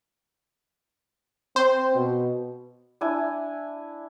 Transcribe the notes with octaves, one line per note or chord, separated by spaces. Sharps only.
C4 C5
B2
D4 E4 G#5